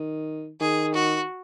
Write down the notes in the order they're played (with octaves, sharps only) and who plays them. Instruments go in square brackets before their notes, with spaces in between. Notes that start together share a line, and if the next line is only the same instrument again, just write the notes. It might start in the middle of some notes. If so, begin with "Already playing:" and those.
Already playing: [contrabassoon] D#3
[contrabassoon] D#3 [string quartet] G#4
[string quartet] F#4